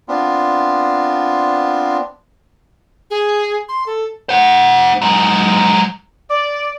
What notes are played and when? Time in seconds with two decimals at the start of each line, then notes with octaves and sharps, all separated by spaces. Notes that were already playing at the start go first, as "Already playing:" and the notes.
0.08 B3 C4 D4 F4
3.10 G#4
3.69 C6
3.86 A4
4.29 C5 F#5
5.01 F#3 G#3
6.31 D5